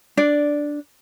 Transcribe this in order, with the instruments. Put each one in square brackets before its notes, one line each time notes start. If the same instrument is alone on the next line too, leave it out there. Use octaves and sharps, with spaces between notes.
[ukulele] D4 D5